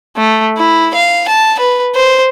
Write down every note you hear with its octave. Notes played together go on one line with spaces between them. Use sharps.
A3
E4
F5
A5
B4
C5